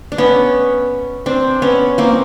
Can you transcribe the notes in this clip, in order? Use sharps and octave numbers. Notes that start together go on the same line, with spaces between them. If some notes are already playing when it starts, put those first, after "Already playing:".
D4
B3 C#4
C4 D4
B3 C#4
A#3 C4